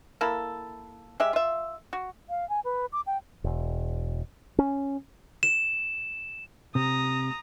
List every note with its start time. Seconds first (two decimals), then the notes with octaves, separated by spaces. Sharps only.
0.21 A#3 E4 A4
1.20 G#3 G4 E5
1.33 F4 E5
1.93 F#4
2.30 F5
2.49 G#5
2.65 B4
2.92 D6
3.07 G5
3.44 E1
4.59 C#4
5.43 E7
6.75 C3 A#5 D#6